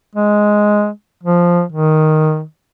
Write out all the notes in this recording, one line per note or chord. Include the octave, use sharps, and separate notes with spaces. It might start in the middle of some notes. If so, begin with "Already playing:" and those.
G#3
F3
D#3